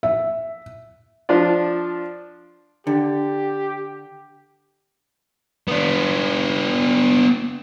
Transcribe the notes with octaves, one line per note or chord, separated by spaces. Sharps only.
E5
F3 D4 F4 D5
D3 G4
B3 D4